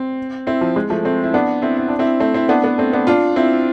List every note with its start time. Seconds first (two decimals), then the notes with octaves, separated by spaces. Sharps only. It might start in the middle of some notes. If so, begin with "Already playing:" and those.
Already playing: C4
0.47 C4 E4
0.61 F3
0.76 G#3
0.90 F3 A3
1.05 A3 C4
1.24 E4
1.34 B3 D4
1.62 C4 E4
1.77 E4
1.88 D4
1.99 C4 E4
2.20 A3 C4
2.34 C4 E4
2.49 B3 D4
2.64 B3 D4
2.78 A3 C4
2.93 B3 D4
3.07 D4 F4
3.36 C4 E4